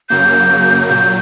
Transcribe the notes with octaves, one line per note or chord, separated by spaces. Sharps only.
F#2 C#3 F#3 A#3 G6
A#2 F#3 G6